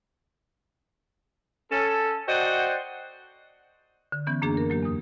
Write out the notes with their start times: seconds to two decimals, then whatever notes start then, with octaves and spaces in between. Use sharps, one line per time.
1.71 C#4 A4
2.28 F#4 C5 D5 D#5 F#5 G5
4.12 D3
4.26 E3 B3 C#4 G6
4.42 F#2 A#3 D4 G#4 A#5
4.57 A#4
4.70 F#3 A#3 G4
4.83 E2 D#6